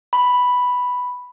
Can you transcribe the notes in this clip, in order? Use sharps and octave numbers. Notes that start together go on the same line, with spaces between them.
B5